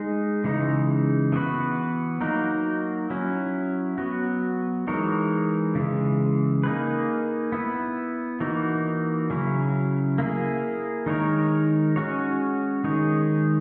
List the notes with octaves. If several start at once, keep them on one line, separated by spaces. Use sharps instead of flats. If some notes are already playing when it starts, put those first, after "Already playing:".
Already playing: G#3 D#4 G#4
C#3 E3 G#3 D#4
E3 B3 F#4 B4
F#3 A#3 D#4 F#4 A#4
F#3 C#4 E4
F#3 B3 F#4
E3 G#3 D#4 A#4 C#5
C#3 E3 G#3
A#3 D#4 G#4 B4
B3 E4 B4
E3 A#3 D#4 F#4
C#3 F#3 C#4 E4
A#3 E4 G#4
D#3 G#3 D#4 A#4 C#5
G#3 C#4 F#4 C#5
D#3 G#3 D#4 G#4 C#5